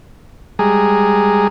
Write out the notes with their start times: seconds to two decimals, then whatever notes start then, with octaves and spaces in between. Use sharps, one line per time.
0.59 G3 G#3 G#4 A#5